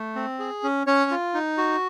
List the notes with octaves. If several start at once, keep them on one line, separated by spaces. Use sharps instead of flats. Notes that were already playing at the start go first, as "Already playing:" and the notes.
Already playing: A3
C4
G#4
C#4
C#4 C#5
F4
D#4
F#4